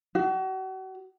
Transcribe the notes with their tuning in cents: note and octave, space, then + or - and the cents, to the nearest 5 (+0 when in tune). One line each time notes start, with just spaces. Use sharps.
F#4 +40